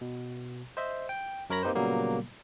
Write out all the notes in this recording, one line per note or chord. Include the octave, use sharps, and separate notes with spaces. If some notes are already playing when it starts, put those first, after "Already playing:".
B2
C5 D#5 E5
G5
F#2 A#4 C#5 B5 A#6
A#3 C4 D#4 G4 B4 C5
A#2 C#3 F#3 G3 A#3 B3